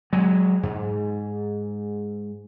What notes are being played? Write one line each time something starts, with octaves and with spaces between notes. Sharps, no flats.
F#3 G#3
G#2